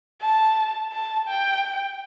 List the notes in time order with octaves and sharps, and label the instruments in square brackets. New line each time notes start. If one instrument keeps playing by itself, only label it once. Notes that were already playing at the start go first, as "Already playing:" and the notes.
[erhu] A5
A5
G5